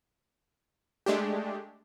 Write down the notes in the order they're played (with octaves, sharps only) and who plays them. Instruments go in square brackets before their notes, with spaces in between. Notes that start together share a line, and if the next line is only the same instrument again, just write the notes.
[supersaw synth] G#3 A3 D4 G4